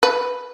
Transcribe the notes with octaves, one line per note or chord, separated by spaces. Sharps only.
B4